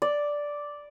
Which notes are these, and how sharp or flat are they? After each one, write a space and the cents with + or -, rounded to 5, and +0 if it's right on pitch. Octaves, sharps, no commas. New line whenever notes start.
D5 -5